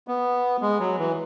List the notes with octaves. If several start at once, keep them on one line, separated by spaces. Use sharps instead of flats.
B3
G#3
F#3
E3